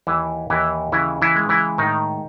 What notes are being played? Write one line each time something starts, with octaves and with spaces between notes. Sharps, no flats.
D#2 E3 E4
D#2 E3 E4
C#3 E3 E4
E3 E4
G#3
E3 E4
A2 D#3 D#4